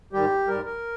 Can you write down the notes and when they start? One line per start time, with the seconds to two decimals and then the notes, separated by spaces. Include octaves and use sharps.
0.13 G#2 D#3 G3 G4
0.47 G#2 G3 A#4
0.65 A#4